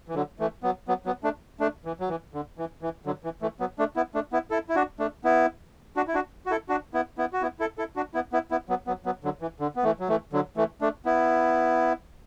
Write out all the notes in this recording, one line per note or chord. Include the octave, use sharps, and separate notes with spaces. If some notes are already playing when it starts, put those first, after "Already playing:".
E3
D3 F#3
E3 A3
F#3 B3
F#3 B3
F#3 B3
A3 D4
A3 D4
E3
F#3
E3
D3
E3
E3
D3 F#3
E3
E3 A3
F#3 B3
A3 D4
B3 E4
A3 D4
B3 E4
E4 A4
E4
D4 F#4
A3 D4
B3 E4
D4 F#4
E4
D4 F#4
F#4
E4 A4
D4 F#4
B3 E4
B3 E4
F#4
B3 E4
E4 A4
E4 A4
D4 F#4
B3 E4
B3 E4
B3 E4
F#3 B3
F#3 B3
F#3 B3
D3 F#3
E3
D3
B3
E3 A3
F#3
E3 A3
D3 F#3
E3 A3
A3 D4
B3 E4